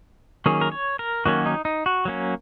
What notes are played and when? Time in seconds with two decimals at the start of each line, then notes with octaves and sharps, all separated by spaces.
0.46 D#3 F#3 A#3 C#4 G#4
0.61 A#4
0.72 C#5
0.99 A#4
1.26 D#3 F#3 A#3 C#4 F#4
1.46 D#4
1.65 D#4
1.86 F#4
2.05 F#3 A#3 C#4